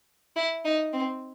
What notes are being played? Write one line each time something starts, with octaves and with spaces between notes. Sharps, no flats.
E4
D#4
C4